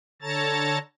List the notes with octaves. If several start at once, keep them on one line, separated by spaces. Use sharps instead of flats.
D3 A4 C#5 A5 A#5 A6